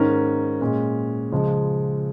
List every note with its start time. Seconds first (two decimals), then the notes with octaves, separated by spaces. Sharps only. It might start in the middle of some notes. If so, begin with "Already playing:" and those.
Already playing: G#2 D#3 C#4 A#4
0.61 A#2 G#3 C#4
1.32 C#2 C#3 F3 G#3